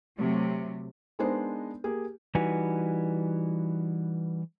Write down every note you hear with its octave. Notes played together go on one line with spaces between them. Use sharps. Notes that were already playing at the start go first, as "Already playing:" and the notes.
C3 F#3 A3
G#3 B3 D4 D#4 A#4 C5
A#3 G4 G#4
E3 G3 D#4 F#4 B4 G#5